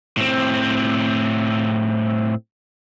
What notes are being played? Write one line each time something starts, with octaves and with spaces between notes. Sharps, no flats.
A2 C4